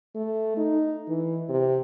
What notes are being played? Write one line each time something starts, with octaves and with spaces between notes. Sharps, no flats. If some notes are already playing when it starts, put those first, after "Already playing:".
A3
D#4
E3
C3